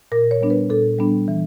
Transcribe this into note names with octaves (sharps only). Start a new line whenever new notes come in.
A#2 A#4
C#5
G3 B3 D4
B4
A#2 A4
G3 B3 D4
E3